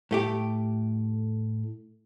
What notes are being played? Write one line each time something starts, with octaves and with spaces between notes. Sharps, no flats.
A2 A3 G4